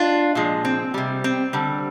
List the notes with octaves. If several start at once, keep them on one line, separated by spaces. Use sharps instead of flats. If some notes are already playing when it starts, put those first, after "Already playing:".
Already playing: D4 F4
A#2 F3 G#3
C4
C3 G3
C4
D3 G3